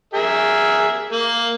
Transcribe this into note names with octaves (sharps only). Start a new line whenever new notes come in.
G#4 A#4 E5
A#3